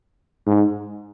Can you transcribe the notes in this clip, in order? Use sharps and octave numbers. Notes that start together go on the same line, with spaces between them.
G#2